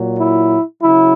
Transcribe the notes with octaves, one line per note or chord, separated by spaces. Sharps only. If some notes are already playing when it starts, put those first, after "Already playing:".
Already playing: A#2 F#3
E4
C#3 F#3 E4